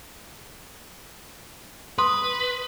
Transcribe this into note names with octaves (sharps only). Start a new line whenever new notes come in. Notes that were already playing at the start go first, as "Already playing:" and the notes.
B4 C6 D#6